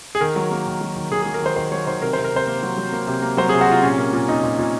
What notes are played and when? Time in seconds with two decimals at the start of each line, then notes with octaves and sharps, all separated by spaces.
0.15 G#4
0.21 D#3 A#4
0.36 F#3
0.51 A#3
0.67 D#3
0.81 F#3
0.96 D#3
1.11 D#3 G#4
1.22 G#4
1.26 F#3
1.34 A#4
1.42 D#3 C5
1.56 D#3 C5
1.72 F#3 C#5
1.87 D#3 C5
2.02 C3 A#4
2.13 C5
2.17 C3
2.24 A#4
2.32 C3 C5
2.47 A#3
2.63 F#3
2.78 F#3
2.92 A#3
3.07 C3
3.22 A#3
3.37 F#3 C5
3.49 G#4
3.53 C3
3.61 F#4
3.67 C3 F4
3.83 A#2 C#4
3.98 A#3
4.13 A#2
4.28 A#2 D#4
4.43 A#2
4.58 A#2